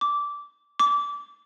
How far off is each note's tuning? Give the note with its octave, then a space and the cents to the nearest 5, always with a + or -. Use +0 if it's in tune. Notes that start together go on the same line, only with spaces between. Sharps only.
D6 -15
D6 -25